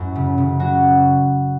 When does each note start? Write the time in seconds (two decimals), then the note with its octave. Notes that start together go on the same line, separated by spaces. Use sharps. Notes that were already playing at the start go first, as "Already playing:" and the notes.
Already playing: F#2 A2 E4 F#4
0.15 C#3
0.38 C#3
0.60 F#3 F#4